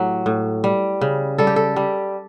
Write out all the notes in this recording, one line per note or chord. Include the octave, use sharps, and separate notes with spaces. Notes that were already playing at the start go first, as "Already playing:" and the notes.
Already playing: A2 F#3 G4
A2
G3
C#3
G3 A4
G4
A4
G3